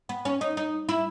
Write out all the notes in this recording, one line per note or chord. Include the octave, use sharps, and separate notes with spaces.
B3
C#4
D#4
D#4
E4